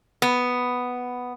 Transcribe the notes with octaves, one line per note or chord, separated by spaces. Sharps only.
B3